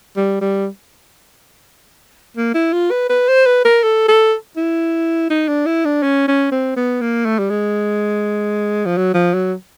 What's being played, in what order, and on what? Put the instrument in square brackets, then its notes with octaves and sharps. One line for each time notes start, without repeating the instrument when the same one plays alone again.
[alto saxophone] G3
G3
A#3
E4
F4
B4
B4
C5
B4
A#4
A4
A4
E4
D#4
D4
E4
D4
C#4
C#4
C4
B3
A#3
A3
G3
G#3
F3
F#3
F3
F#3